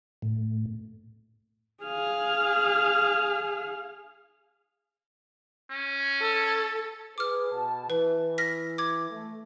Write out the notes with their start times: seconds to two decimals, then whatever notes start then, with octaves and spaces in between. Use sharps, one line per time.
0.22 A2
1.83 G#4 F5
5.71 C#4
6.21 A4
7.18 G#4 B4 D6 F6
7.51 B2 A5
7.90 E3 B4
8.38 F6 A#6 B6
8.78 D6 G#6
9.10 A3